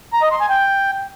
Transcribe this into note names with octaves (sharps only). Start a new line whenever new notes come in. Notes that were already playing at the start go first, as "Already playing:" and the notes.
A#5
D#5
C6
G#5
G5